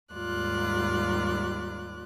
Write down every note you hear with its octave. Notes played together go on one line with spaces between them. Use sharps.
D#2 G#2 G3 F4 D5 F#6